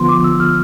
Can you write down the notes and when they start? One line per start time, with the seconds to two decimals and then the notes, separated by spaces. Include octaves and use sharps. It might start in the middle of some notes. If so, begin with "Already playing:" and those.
Already playing: D3 F3 B3 F4 C6
0.09 D6
0.24 E6
0.40 F6